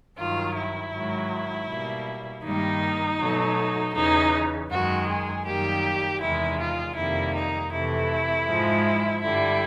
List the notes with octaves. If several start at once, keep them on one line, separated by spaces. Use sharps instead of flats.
G2 D#3 F#3 F4
E4
G#2 D#3 F#3
B2 G3 A#3
G2 D#3 G3 A#3 D#4
B2 F#3 A3
E2 C#3 E3 D#4
F#2 D#3 G#3 F#4
G#4
F#2 D#3 G3 A#3 G4
E2 C3 D#3 G#3 E4
F4
F2 C3 D#3 G3 A#3 E4
D#4
F2 C3 E3 A3 E4
G#2 F3 G#3
G2 D3 G3 E4